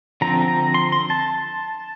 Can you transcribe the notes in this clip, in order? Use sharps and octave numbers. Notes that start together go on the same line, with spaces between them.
D3 F3 C4 A#5
A#5
C6
C6
A5